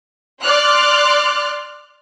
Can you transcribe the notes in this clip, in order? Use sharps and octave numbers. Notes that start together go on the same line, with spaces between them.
D5 C6 F6 F#6